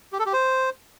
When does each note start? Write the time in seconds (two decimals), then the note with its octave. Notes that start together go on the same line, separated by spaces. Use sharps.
0.12 G4
0.19 A4
0.26 G4
0.33 C5